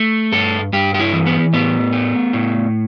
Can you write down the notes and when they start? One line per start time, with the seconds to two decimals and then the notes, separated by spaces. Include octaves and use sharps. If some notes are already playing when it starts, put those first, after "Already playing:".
Already playing: A3
0.32 G2 A4
0.73 G2 G4
0.94 G4
0.99 E4
1.13 E3
1.26 B3
1.53 A2 B3
1.93 A3
2.33 A2